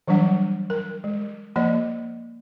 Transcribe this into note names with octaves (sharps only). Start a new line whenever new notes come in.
E3 F#3 G3 D4 F#5
A#4
G#3
F3 A#3 D5 D#5